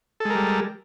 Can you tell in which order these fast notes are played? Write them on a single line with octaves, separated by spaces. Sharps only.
A4 G#3 A#4 G3